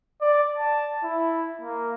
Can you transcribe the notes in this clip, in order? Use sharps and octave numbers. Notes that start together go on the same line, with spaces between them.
D5
A5
E4
A#3